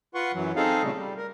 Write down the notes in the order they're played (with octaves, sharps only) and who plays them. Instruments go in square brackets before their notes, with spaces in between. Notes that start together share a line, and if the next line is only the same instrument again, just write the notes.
[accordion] F4 B4 F#5 C6 C#6
F#2 E3 F#3
C4 D#4 G#4 A4 F5
A#2 C#3 G3 A3
G3
A#4